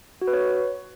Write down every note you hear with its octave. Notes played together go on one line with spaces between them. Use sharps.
F#4
B4
C#5